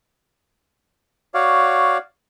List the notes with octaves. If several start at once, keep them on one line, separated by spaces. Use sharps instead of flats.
F#4 C#5 D5 F5